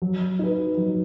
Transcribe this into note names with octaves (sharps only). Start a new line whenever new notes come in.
F#3
D#4 B4
F#3